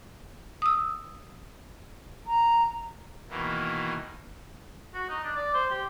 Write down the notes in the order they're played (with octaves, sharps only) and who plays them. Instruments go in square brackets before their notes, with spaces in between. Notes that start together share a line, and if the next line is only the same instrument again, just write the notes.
[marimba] D#6 E6
[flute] A#5
[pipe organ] B2 D#3 E3 A#3
[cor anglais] F#4
D#4
D4
D5
C5
G4